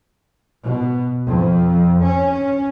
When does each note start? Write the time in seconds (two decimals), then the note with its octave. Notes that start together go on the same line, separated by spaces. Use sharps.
0.62 B2
1.25 F2
2.02 C#4